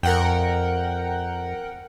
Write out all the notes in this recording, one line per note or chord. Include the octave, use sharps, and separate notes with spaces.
F2 A#4 F#5 G5